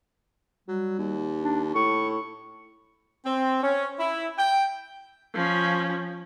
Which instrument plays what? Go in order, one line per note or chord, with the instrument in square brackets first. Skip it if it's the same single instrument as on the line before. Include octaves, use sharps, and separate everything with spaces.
[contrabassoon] F#3 [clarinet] G3
[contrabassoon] D#2
[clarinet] D4
[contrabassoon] A2 [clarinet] C#6
[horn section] C4
C#4
E4
G5
[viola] F3 C#4